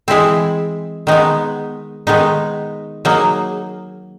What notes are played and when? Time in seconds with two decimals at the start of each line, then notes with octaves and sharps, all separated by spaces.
0.08 E3 G#3 C4 E4 G#4
1.07 D#3 G#3 B3 D#4
2.07 D#3 G#3 B3 D#4
3.05 F#3 A#3 D#4 G#4